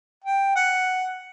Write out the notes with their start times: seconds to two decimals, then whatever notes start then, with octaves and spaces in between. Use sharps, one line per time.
0.24 G5
0.56 F#5